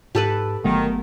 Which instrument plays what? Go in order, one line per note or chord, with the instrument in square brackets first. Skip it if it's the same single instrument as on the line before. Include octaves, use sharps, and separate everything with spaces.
[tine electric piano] G#2 A5 [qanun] G4 A4 B4
[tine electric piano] G1 F#5 [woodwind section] D#3 [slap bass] F#3 A3 B3